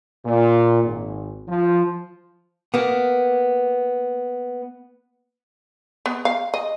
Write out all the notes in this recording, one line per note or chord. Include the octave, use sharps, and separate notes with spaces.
A#2
G#1
F3
A#3 B3
B3
F5
D#5